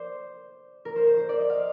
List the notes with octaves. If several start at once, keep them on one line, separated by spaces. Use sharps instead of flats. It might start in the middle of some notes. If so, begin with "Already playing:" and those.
Already playing: C5 D5
A#4
C5
C5
C5
D5
D#5
F5